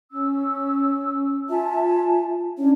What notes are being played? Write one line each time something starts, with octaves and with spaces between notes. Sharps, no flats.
C#4 E6
F4 E5 G#5 A5
C#4 D4 E4 C#5